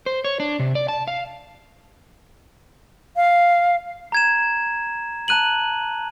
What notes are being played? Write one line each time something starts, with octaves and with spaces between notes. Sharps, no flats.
C5
C#5
D4
C3
D5
A5
F5
F5
A#5 G#6 E7
A5 A#5 F#6 D#7 F#7